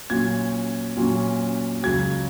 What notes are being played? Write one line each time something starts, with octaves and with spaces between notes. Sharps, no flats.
A#2 F#3 C#4 G#6
A#2 F#3 C#4
C#2 C#3 F#3 G#6